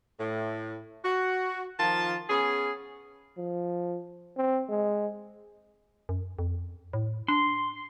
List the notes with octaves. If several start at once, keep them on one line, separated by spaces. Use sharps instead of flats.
A2
F#4
D#3 F3 F4 A5
B3 C#4 G#4
F3
C4
G#3
F#2
F2
A2
D4 C6